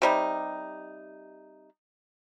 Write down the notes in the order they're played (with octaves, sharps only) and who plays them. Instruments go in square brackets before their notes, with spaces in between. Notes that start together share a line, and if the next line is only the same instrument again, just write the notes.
[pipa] C3 G3 D#4